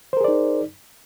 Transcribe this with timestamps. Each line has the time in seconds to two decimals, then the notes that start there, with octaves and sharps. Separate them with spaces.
0.13 C5
0.17 A#4
0.21 G#4
0.24 D5
0.28 D#4